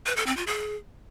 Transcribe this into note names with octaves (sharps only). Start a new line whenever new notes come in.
B4
A4
C4
F4
G#4